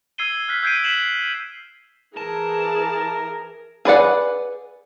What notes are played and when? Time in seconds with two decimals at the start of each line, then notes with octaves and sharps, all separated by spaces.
0.18 E6 G#6 C7 D#7 G7
0.48 F6 F#6 B6
0.63 E6 G6 G#6 C7 D7 D#7
0.84 B6 C7 E7 F#7
2.17 E3 G#4 A#4 A5
3.85 G#4 B4 D5 F#5